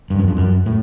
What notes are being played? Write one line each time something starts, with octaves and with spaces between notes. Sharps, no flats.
G2
F#2
F2
F#2
A2